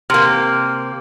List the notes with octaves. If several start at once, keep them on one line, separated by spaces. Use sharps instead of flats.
C3 A#3 F6